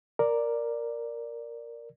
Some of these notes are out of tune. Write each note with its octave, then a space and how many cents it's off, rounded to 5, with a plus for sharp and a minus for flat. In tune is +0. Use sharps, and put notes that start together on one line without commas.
A#4 +0 D5 +0